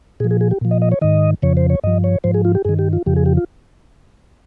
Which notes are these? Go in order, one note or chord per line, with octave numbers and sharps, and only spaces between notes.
A#2 F3 G#4
G#4
G#4
G4
A#2 F3
D#5
D#5
C#5
G#2 D#3 D#5
F2 C#3 F3 C#5
C5
C#5
G2 F3 D#5
C#5
G#2 F3 C5
G#4
F4
G4
G2 D#3 G#4
G4
F4
F2 C#3 F3 G4
G#4
G4
F4